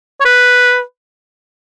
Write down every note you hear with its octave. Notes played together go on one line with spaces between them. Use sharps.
C#5
B4